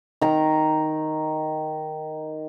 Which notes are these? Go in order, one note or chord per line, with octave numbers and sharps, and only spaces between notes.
D#3 A#5